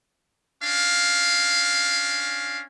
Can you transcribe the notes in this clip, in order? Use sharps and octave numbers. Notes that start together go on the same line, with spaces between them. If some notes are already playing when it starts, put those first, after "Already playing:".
C#4 D4 F5